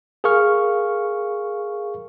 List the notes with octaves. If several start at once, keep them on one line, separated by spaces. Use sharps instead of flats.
G#4 A#4 F5 C#6 F6